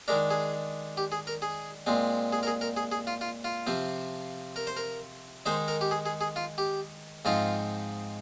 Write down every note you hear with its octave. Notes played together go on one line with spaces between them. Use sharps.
D#3 G#3 D4 A#4
G#4
G4
G#4
A#4
G#4
A#2 G#3 C4
G#4
A#4
G#4
A#4
G#4
G#4
F4
F4
F4
C3 F3 C4
A#4
C5
A#4
D#3 G#3 D#4 C5
A#4
G4
G#4
G#4
G#4
F4
G4
G#2 F3 C4 D#4 F4